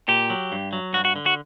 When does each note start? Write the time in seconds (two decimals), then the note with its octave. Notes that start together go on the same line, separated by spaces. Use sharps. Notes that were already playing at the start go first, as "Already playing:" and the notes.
0.08 A#2 G4
0.30 F#3
0.52 G2
0.73 F#3
0.93 G2 F#4
1.05 F#4
1.16 D3
1.26 F#4